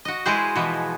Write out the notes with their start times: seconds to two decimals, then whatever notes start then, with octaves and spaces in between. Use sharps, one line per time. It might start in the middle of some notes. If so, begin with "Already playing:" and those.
0.05 F#4 D#5
0.26 G#3 E4 G#4 B4 C5
0.55 B2 E3 F3 G#3 B3